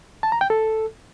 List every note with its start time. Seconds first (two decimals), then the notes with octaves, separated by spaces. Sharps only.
0.23 A5
0.32 A#5
0.41 G5
0.50 A4